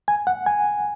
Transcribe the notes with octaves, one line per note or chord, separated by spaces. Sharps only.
G#5
F#5
G#5